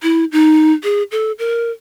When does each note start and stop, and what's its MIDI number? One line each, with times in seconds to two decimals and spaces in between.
0.03 0.25 64
0.32 0.73 63
0.84 1.03 68
1.12 1.32 69
1.39 1.71 70